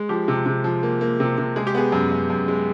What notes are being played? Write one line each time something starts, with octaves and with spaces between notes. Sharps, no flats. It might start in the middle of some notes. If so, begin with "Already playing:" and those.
Already playing: G#3
F3 G4
C3
C3
F3
A#3
A#3
C3
C3
G#3 G#4
G4
B3 G#4
F#2
F#2
F#2
G#3